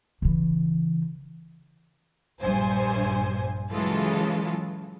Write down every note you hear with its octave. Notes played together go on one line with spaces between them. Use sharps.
C#3 E3
A#1 G2 C5 G#5
C#3 E3 F#3 G#3 F4 A4